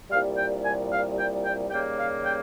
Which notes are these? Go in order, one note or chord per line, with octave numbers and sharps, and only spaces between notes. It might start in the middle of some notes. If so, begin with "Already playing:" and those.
C2 A#2 G3 F5
G5
G#5
F5
G5
G5
D#2 C#3 G3 A#3 G5
F5
G5